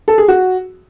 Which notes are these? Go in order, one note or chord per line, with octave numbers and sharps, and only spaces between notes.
A4
G#4
F#4